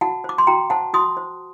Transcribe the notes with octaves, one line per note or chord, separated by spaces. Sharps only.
F#4 F#5 A5
C5 D6
C6
F#4 G5 A#5
C5 F#5 A5
F#4 C6 D#6
C5